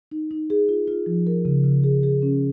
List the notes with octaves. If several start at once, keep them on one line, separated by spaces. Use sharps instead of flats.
D#4
D#4
G#4
F4
F4
F3
A#4
C#3
C#3
G#4
G#4
C#4